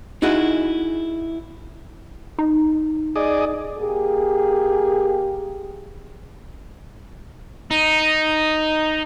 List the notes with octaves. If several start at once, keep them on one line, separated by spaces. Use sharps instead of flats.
D#4 E4 F#4 G#4
D#4
G#4 D5 D#5
A#3 G4 G#4
D#4